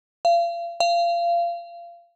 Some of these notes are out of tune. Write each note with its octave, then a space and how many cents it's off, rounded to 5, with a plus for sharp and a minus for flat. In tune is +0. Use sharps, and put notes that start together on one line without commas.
F5 -35
F5 -25